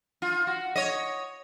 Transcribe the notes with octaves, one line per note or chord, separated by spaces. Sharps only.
F4
F#4
C#5 D#5